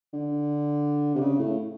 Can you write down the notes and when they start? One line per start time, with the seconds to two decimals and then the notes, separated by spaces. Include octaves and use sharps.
0.13 D3
1.15 C3
1.21 C#3
1.39 A2